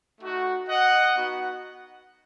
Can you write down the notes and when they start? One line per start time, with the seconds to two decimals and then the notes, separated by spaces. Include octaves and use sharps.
0.21 A3 D#4 F#4
0.69 D#5 F#5
1.17 B3 D#4 F#4